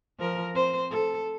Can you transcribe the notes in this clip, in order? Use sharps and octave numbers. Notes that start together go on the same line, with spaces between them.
F3 A#4
C4 C5
A4